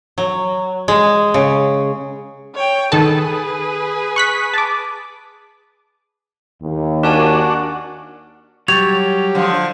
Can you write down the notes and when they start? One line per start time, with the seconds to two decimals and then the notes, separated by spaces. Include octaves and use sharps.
0.18 F#3
0.88 G#3
1.34 C#3
2.55 C#5 G5
2.92 D#3 G#4 A4 B4 A5
4.16 C#6 F#6 B6
4.54 A5 D6
6.62 D#2
7.03 D4 F#4 A#4 G#5 A5
8.68 F#3 G3 G4 C#5 A6 F7
9.35 D3 F3